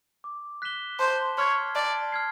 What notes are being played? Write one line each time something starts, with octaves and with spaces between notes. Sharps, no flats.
D6
F#6 B6 E7 G7
C5 A5
C#5 C6 F6 G#6 C7
D5 A5
F6 G#6 C7